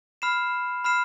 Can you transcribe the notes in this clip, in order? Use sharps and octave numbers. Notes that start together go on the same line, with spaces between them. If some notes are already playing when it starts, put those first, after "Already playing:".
B5 F6 C7 E7
B5 F6 C7 E7